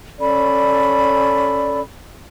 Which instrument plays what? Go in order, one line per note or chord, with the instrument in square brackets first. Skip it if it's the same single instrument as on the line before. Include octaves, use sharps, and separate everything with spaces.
[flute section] C#4 A4 D5 B5